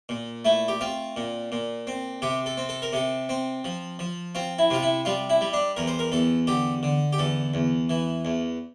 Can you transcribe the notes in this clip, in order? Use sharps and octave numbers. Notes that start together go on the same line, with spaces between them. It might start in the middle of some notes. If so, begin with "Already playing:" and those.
A#2
A3 E4
G4
C4 F4
A#2
A#2
C4
C3 G4
A4
C4
A4
A#4
C3 A4
C4
F3
F3
C4 F4
E4
C3 F4
E4
G3 F4
E4
G3
D4
E2 A#4
C5
A#4
E2 A4
D3 G4
D3
G4
E2 A4
E2
E3
E2